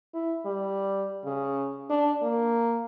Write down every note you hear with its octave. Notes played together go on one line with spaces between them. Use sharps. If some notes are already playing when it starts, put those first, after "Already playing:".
E4
G3
C#3
D4
A#3